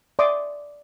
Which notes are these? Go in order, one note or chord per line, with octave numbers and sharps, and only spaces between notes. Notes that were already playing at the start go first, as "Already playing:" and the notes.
D5 E5 C6 D6 D#6